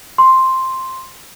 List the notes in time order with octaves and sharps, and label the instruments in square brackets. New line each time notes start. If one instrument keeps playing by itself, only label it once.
[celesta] C6